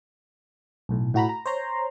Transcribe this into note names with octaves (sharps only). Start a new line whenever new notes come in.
B1 A2
A2 F#4 A#5 B5
A#5
C5 C#5 A#5 C6